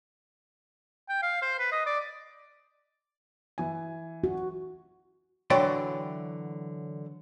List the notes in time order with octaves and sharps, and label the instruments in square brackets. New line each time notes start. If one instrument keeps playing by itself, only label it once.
[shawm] G5
F5
C5
B4
D#5
D5
[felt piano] E3 G#5
[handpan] F#4
[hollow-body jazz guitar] D3 E3 F#3 D5 G5 C6